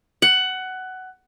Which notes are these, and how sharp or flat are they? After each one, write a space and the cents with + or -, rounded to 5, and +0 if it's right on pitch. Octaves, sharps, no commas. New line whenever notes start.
F#5 +15